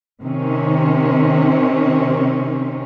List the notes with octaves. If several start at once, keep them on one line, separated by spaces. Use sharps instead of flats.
C3 D#3 C4 C#4